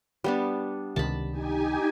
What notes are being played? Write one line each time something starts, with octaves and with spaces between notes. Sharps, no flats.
G3 B3 D4
C#2 C3 D#3 A5 B5
D#4 G4 G#5